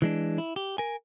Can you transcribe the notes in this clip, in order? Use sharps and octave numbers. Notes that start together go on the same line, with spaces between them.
E3 G#3 D4
E4
G4
A#4 G#5